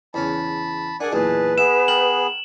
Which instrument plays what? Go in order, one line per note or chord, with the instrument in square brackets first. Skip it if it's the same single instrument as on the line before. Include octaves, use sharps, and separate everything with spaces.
[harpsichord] E2 C#3 C#4 [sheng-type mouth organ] A5 B5
[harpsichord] D4 G#4 [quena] A#4 [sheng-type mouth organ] D5 F#5 G#5
[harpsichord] B1 E2 A#2 [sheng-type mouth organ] G#4 A5 [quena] B4
[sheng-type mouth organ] B3 G#4 [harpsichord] E5 [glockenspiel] E7
[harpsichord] A#4 G5 A5 [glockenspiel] F#7